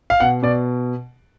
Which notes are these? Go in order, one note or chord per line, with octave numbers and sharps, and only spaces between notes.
F5
B2 F#5
B2 D5